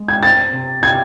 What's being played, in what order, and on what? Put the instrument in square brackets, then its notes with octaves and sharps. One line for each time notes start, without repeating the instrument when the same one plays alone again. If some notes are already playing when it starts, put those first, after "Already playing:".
Already playing: [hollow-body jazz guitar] G#3
[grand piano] G#6
[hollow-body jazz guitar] C4 [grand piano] A6
[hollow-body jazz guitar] C3
[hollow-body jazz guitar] C3 [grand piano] G#6